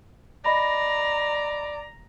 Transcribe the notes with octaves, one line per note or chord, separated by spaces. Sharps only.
D5 D#5 A#5 B5 A#6